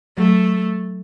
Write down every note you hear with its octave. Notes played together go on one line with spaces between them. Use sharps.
F#3 A3